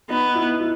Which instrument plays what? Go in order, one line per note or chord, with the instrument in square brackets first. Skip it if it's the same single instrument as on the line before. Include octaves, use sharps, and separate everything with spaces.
[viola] B3 [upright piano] D#4
[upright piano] E4
E4